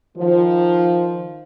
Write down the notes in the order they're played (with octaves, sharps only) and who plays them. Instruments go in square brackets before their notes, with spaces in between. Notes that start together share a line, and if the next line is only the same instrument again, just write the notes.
[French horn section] D#3 F3